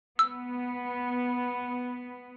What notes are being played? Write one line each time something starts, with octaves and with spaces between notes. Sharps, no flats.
B3 E6